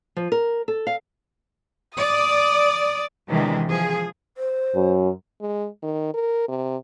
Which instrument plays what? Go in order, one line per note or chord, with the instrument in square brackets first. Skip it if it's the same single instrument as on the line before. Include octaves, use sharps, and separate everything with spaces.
[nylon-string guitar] F3
A#4
A4
F5
[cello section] D5 [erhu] D#6
[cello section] C3 D#3 E3 G#3 D4
F3 G#4
[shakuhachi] C5
[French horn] F#2
[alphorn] G#3
D#3
A#4
C3